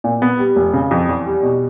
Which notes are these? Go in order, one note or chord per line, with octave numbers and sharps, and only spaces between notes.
A#2
B3
G3
F1
C#3
F2
E2
G3
B2